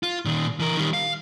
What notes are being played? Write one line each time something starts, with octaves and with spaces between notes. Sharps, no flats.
F4
A#2 D#3
E3 A#4
D#3 G3
F5